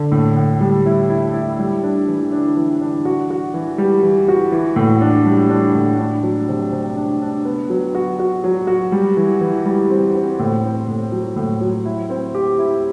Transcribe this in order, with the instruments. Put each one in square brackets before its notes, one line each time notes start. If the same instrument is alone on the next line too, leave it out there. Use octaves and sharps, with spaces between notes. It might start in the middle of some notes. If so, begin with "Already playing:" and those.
Already playing: [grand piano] D3
A2
A2
G3
E4
E4
E4
G3
D4
E3
D4
E3
D4
F#4
F#4
E3
G3
E3
F#4
E3
A2
D4
G3
D4
A2
D4
F#3
C3
C3
D4
D4
B3
F#3
F#4
F#4
F#3
F#4
G3
E3
E3
G3
C4
C4
A2
C4
A2
F#3
A2
F#3
E4
C4
G4
E4